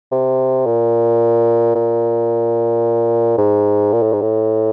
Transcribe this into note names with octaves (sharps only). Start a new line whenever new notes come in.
C3
A#2
A#2
G#2
A#2
A2
G#2
A2